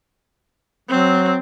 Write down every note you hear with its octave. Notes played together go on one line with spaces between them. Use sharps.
F#3 C4